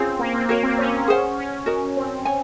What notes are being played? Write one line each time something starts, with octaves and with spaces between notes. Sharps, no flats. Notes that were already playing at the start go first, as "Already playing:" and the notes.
Already playing: C4 C#4 F4 G#4 C#5
A#3
C4
A#3 F#4 A#4 C#5
C4
C#4
G#4 C5 F#5
C#4
F#4 A#4 D#5
C4
C#5 G#5